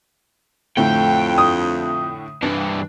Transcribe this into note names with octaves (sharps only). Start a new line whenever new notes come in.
F2 A2 D3 A3 G5
D#6
G2 E3 D4